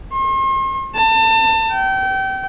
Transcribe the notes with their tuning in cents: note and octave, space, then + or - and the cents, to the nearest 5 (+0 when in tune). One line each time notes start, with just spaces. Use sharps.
C6 +45
A5 +30
G5 -30